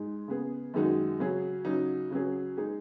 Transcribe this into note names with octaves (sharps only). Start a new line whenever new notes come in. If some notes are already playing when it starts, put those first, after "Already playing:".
Already playing: G#2 G#3 D#4 G#4
C#3 B3 G#4
F#2 D#3 G#3 D#4 F#4
C#3 F#3 C#4 G#4
C#3 F#3 D#4
C#3 F#3 C#4 G#4
G#3 D#4 G#4